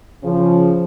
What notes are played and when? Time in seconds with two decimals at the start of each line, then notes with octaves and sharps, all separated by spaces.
0.23 C#3 F3